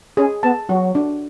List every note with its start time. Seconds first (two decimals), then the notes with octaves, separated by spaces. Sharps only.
0.17 C#4 G#4
0.43 B3 A5
0.69 F#3 F#4
0.95 D4